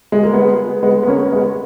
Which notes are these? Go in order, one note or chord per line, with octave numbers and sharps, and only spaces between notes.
G#3
A#3
G#3 B3
G#3 B3
B3
A#3 C#4
G#3 B3